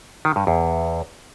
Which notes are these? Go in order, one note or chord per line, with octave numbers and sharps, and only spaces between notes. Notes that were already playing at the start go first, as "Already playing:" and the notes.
D#3
G2
E2